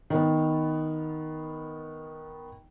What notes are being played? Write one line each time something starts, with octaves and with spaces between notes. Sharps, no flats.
D#3 B3